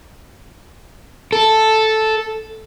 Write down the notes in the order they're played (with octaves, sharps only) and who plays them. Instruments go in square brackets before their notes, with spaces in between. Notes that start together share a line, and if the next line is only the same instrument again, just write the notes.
[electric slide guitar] A4